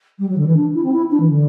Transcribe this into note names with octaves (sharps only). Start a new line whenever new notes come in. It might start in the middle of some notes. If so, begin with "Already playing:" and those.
G3
F#3
D3
E3
D4
E4
C4
E4
D4
E3
D3